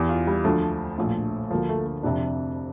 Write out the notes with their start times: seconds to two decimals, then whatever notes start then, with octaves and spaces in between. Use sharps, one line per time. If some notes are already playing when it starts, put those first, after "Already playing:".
Already playing: E2 E3 G4
0.09 F4
0.27 G3
0.44 D2 D3 F3 A3
0.98 A#1 A2 F3
1.50 D2 D3 F3 A#3
1.69 A3
1.86 A3
2.03 F1 F2 C3 F3 D4